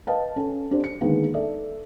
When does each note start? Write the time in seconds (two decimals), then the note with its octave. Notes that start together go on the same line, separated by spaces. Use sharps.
0.07 B4 D#5 F5 G5 A5
0.36 C#4 A4
0.71 C4 D4 G4 C5
0.84 C#7
1.01 D3 D#3 G#3 A#3 B3 D#4
1.34 A4 D5 E5